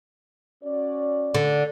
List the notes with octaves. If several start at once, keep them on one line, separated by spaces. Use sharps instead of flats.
C#4 F#4 D5
D3